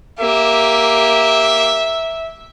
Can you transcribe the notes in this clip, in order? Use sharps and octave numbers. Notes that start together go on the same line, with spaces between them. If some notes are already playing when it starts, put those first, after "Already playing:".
A#3 G4 E5